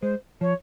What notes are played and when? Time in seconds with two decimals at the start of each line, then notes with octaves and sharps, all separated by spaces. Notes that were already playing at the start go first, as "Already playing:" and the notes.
0.02 G#3 C5
0.41 F3 C#5